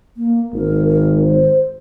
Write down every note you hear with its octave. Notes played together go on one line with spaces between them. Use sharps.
A#3
G#1 A#4
A#4
C5